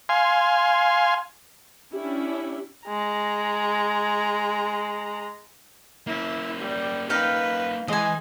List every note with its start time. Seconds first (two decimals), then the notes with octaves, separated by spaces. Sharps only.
0.09 F5 G#5 C6
1.93 C#4 D4 E4 G4
2.88 G#3 A#5
6.07 A#3 C#4 E4
6.59 G3
7.10 D#4 B4 F5 G5
7.88 E3 G#3 D#5 G#5